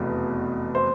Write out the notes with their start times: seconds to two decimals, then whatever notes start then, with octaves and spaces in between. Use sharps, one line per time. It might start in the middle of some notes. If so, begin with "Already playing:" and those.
Already playing: F1 E2 B2
0.75 C5